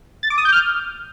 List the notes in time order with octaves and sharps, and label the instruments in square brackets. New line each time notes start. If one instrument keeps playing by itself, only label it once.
[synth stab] A6
D6
D#6
G6
F6